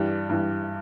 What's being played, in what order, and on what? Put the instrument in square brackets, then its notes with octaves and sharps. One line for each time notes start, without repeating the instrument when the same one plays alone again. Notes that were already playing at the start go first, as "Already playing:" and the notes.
Already playing: [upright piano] G2 E3 G3
G2 E3 G3